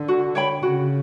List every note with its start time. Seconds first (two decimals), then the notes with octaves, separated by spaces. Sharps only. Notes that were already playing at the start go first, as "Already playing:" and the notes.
Already playing: D3
0.08 F#4
0.35 C#5 G5 B5
0.61 C#3 F#4